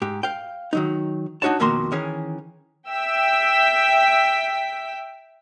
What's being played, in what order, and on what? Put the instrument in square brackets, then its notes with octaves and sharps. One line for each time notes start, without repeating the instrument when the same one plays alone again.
[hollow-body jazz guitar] G#2 G4
F5 G5
D#3 F#3 D#4
D4 D#4 F#4 C#5 A5
F2 B2 D#3 A#3 A#5 C6
D#3 E3 C#4 G#4
[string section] E5 G5 E6 B6